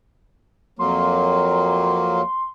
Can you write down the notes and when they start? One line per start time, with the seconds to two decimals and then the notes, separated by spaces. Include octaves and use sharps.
0.79 F2 F#3 A#3 C6